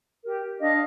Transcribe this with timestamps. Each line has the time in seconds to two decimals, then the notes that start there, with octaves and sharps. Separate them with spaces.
0.23 G4 A#4
0.59 D4 D#5 F5